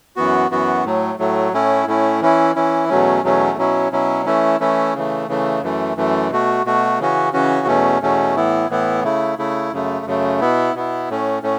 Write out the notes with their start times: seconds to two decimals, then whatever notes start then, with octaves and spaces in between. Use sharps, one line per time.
0.16 F#2 E3 B3 F#4
0.50 F#2 E3 B3 F#4
0.85 A2 F#3 A3
1.19 A2 F#3 A3
1.52 A2 A3 C#4 E4
1.87 A2 A3 C#4 E4
2.21 E3 C#4 E4
2.56 E3 C#4 E4
2.89 E2 B2 F#3 A3 C#4
3.23 E2 B2 F#3 A3 C#4
3.58 B2 F#3 C#4 E4
3.91 B2 F#3 C#4 E4
4.26 E3 A3 C#4 E4
4.60 E3 A3 C#4 E4
4.95 C#3 E3 A3
5.28 C#3 E3 A3
5.63 F#2 E3 A3
5.96 F#2 E3 A3
6.30 B2 A3 F#4
6.65 B2 A3 F#4
6.99 C#3 E3 C#4 F#4
7.33 C#3 E3 C#4 F#4
7.67 E2 B2 A3 C#4
8.02 E2 B2 A3 C#4
8.36 A2 E3 B3 E4
8.70 A2 E3 B3 E4
9.04 C#3 A3 E4
9.38 C#3 A3 E4
9.72 F#2 C#3 A3
10.06 F#2 C#3 A3
10.41 B2 B3 E4
10.74 B2 B3 E4
11.09 A2 A3 C#4
11.43 A2 A3 C#4